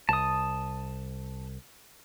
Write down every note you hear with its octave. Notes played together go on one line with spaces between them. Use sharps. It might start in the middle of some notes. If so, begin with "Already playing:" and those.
C2 A5 D#6